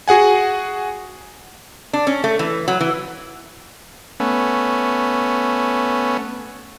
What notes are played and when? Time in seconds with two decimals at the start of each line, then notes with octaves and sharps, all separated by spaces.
0.08 F#4 G#4 F#5 G#5
1.93 D4
2.07 C#4
2.24 A3
2.39 E3
2.68 F#3
2.81 E3
4.20 A3 B3 C#4